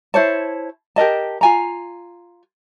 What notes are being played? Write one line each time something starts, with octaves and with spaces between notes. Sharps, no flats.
E4 C5 C#5 A5
G4 A#4 D#5 A5
F4 G#5 A#5